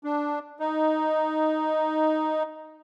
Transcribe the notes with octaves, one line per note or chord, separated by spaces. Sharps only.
D4
D#4